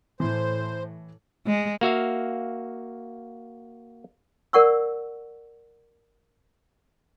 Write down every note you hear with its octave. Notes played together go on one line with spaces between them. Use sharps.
A2 E3 C5
G#3
A#3 F#4 E5 F5
A#4 D5 F#5 C#6 E6